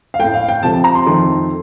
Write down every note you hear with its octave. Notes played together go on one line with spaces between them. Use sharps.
F5
A2 A3 G5
F5
G5
C3 F3 A3 A5
A5
A#5
C6
F2 D#3 A3